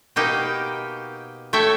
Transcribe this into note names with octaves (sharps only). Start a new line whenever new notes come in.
B2 A#3 D#4 G4
A3 C#5 E5 G5